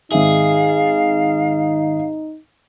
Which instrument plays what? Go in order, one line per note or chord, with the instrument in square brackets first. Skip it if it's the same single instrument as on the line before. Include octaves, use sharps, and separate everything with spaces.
[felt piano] G#1 E5 [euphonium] D#4 [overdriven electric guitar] G#4 [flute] F5